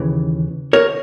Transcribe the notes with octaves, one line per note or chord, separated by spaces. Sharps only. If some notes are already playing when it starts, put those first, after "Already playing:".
Already playing: D#2 C#3 E3
A#4 C#5